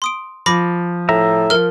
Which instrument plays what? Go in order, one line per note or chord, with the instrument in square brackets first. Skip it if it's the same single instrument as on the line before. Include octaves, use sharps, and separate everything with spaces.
[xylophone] C6 D#6 D7
[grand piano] F3 [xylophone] B5 D6 A#6
[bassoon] A2 [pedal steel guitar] E5 A#5
[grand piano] F3 [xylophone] A#4 F6